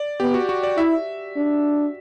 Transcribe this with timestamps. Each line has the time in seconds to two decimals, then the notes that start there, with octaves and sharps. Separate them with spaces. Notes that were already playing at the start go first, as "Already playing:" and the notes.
Already playing: D5
0.20 B3 G4
0.34 F#4
0.49 F#4
0.63 D5
0.77 E4 E5
1.36 D4